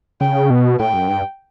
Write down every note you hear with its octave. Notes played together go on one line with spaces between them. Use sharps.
C#3 G5
B2
A2 G5
F#2
G2